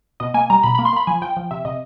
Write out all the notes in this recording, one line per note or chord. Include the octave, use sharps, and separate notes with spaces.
B2 D#5
A#3 G#5
G3 A#5
B2 B5
A#3 B5
C6
A#3 B5
F3 G#5
F3 G5
F3
C3 E5
C3 D#5